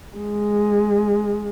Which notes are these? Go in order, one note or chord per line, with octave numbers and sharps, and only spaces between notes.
G#3